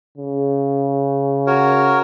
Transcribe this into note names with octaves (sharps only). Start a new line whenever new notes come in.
C#3
F#4 A#4 C#5